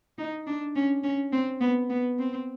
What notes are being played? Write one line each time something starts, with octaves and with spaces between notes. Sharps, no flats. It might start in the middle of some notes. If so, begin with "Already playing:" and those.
D#4
D4
C#4
C#4
C4
B3
B3
C4